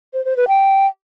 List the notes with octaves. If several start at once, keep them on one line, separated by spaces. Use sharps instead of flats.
C5
C5
B4
G5